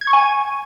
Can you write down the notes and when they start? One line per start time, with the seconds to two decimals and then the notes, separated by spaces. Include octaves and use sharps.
0.01 G#6
0.07 C#6
0.13 G#5